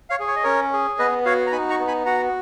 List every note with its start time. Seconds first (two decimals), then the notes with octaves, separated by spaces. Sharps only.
0.10 C#5 F5
0.20 G#4
0.28 C#5
0.36 D#5
0.44 C#4 A#4 C#5
0.73 G#4
0.99 B3 B4 D#5
1.25 F#4 C#5 F5
1.47 A#5
1.52 D#4 G#5 B5
1.70 A#5 C#6
1.80 B3
1.88 G#5 B5
2.05 F#4 F#5 A#5